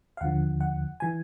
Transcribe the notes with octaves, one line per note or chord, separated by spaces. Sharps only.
F5
D#2 D3 F3 F#5
F#5
E3 G#5